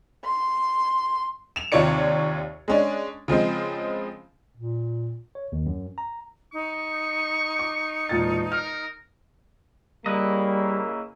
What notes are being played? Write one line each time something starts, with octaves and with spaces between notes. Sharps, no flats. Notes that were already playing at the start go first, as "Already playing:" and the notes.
C6
E7 F7
D#2 C3 F4 C#5 D5 C#7
G#3 C#4 D4
C#3 F3 G#3 C4
A#2
C#5
D#2
F#2
A#5
D#4 C#6
D6
E1 A#2 A6
A#4 F6
C#3 G3 A#3 E4 B4 D#5